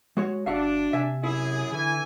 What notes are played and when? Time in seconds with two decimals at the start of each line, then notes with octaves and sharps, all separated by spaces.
0.17 G#3 F#4 C#5
0.46 G1 D4 F#4 E5 F5
0.93 C3 E5 G#5
1.23 F#2 E4 G#4
1.72 D3 E3 G#5